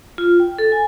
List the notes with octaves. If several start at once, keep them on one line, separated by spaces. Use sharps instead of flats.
F4
G5
A4
G#5